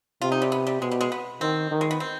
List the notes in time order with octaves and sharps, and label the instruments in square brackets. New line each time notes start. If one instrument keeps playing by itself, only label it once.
[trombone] C3 [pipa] F4
[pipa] D#4
G3
B3
G3
[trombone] B2 [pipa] G#3
[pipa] G3
G#3
B3
[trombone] D#3 [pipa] C4
[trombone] D#3
[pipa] G#3
B3
C4